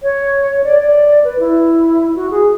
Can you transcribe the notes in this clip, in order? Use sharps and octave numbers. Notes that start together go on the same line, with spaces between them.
C#5
D5
D5
B4
E4
F#4
G#4